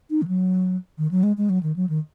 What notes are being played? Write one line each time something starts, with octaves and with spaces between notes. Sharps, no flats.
D#4
D#3
F#3
D#3
F#3
G#3
G#3
F#3
D#3
F#3
D#3